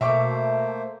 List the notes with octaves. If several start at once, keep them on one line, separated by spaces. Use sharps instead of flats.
B2 A3 A#3 C5 E5 C#6 D6